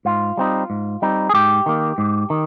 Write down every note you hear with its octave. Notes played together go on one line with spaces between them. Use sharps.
G#2 F4
G3 C4 D#4
G#2
G3 C4 D#4
G#4
G#2 G4
D#3 A#3
G#2
D#3